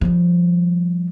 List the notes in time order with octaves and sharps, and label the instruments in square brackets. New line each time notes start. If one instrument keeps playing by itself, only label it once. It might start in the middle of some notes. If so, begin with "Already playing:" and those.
[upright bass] F3 G3